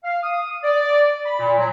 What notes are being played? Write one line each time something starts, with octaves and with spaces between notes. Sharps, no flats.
F5
D#6
D5
B5
A#2
F#3